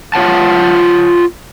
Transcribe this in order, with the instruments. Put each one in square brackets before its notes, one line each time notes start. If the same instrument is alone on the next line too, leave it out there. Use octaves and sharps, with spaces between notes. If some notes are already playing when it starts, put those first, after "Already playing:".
[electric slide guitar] F4 C#5 F#5 A5